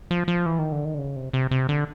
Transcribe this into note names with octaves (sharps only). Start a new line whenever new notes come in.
F3
F3
E3
D#3
D3
D#3
D3
C#3
C3
C3
C3
D3